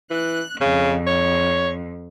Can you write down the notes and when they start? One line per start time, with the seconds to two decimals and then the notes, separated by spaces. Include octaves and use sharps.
0.11 E3 F#6
0.61 F2 C#3
1.07 C#5